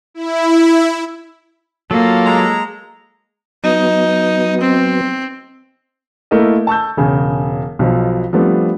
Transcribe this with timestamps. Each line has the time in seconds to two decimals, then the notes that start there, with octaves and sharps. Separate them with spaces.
0.14 E4
1.91 F#3 A#3 F4 A4
2.25 G#3 A#5
3.63 F#3 B3 D#4
4.61 C4
6.31 A3 A#3 E4 A#4 D#5
6.67 A5 C#6 E6 G6
6.97 E1 C#3 G#5
7.79 B1 B2 F3
8.33 F3 G3 A3 B3 C4 D4